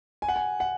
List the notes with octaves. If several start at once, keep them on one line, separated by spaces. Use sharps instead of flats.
G#5
F#5
G#5
F#5